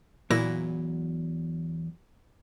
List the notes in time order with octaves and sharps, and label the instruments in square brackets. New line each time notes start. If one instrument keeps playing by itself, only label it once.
[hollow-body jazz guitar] E2 F#3 B4 [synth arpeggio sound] A#2 E4 A#6